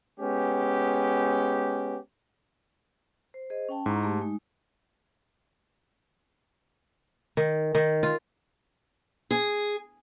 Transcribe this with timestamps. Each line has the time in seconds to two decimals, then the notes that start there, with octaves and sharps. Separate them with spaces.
0.19 G#3 B3 C#4 G4
3.34 C5
3.50 G#4 C5 D#5
3.69 C#4 G5 A5
3.86 G#2 E4 A#5 C#6
4.02 A3 G4 A5
4.21 G#3 D#4
7.37 D#3
7.75 D#3
8.03 F4
9.31 G#4